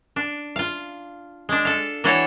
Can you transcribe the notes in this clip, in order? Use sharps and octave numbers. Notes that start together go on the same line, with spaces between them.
D4
F4 F5
G#3 D4
A4 F5
E3 D4 F#4 A4 C#5